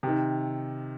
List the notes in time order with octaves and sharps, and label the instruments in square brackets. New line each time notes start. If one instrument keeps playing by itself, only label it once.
[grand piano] C3 D#3